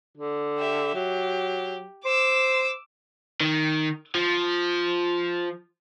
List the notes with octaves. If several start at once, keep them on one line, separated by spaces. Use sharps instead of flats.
D3
G4 E5
F#3 G4
C5 D6 E6
D#3
F3